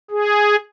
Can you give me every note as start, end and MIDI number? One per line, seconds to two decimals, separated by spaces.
0.11 0.56 68